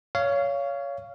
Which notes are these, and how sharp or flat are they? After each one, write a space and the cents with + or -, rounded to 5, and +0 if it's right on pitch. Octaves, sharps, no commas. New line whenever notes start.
C#5 +20 F5 -15